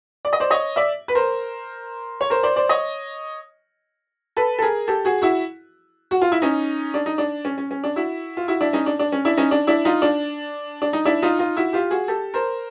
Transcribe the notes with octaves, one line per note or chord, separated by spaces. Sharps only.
D5
D#5
C5 D5
C#5 D#5
D5 E5
B4
A#4 C5
C#5
A#4 C5
C5 D5
C5 D5
C#5 D#5
A4 B4
A4
G#4 A#4
G4 A4
F#4 G#4
E4 F#4
F#4
F4
E4
C#4 D#4
D4
D#4
D4
C#4
C#4
C#4
D4
E4 F#4
F4
E4 F#4
D4 E4
C#4 D#4
D4
D4
C#4
D4 E4
C#4 D#4
D4
D4 E4
D#4 F4
D4
D4
D#4
D4 E4
D#4 F4
D#4 F4
E4 F#4
F4 G4
F#4 G#4
G4 A4
A#4 C5